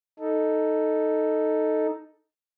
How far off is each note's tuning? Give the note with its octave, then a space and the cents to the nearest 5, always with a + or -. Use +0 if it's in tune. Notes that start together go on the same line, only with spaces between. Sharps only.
D#4 +0 A4 +0